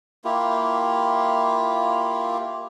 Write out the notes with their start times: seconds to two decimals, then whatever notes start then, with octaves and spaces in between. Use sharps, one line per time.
0.24 A#3 E4 F4 G4